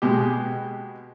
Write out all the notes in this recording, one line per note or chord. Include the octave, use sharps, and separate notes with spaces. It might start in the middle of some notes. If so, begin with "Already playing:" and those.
B2 G#3 G4